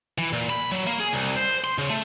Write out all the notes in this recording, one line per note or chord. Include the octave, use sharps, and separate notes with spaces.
E3
A#2
B5
F#3
A#3
G#4
C2
C5
C6
C#3
A3